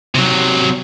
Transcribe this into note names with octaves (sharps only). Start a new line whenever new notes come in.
C3 F#3